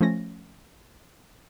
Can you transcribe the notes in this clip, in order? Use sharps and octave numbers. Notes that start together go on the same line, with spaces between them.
F3 A3 C#4 A#6